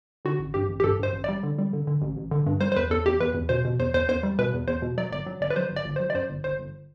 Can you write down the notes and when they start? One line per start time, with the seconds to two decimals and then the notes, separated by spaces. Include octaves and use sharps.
0.25 D3 F#4
0.39 A1
0.54 G2 G4
0.69 A1
0.80 G4
0.84 G2 A4
0.99 G2 C5
1.13 A1
1.24 G3 D5
1.43 D3
1.58 G3
1.73 D3
1.87 D3
2.02 A1
2.17 A1
2.31 D3
2.46 G2
2.61 G3 C5
2.72 C5
2.76 E2 B4
2.90 E2 A4
3.06 E2 G4
3.20 E2 B4
3.34 E2
3.49 B2 C5
3.65 B2
3.79 E2 C5
3.94 E2 C5
4.09 E2 C5
4.23 G3
4.39 B2 B4
4.53 E2
4.68 E2 C5
4.82 B2
4.98 F#3 D5
5.11 G1 D5
5.26 F#3
5.41 G1 D5
5.50 B4
5.56 F#3 C5
5.70 G1
5.76 D5
5.85 G1
5.96 C5
6.00 F#3
6.10 D5
6.15 F#2 C5
6.30 G1
6.44 G1 C5
6.59 G1